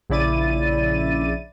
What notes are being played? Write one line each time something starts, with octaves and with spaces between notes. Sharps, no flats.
A#1 C#3 E4 D5 A6 D#7